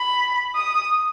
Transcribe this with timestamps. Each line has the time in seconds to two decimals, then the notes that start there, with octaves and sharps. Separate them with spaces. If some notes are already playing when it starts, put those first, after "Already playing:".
Already playing: B5
0.55 D#6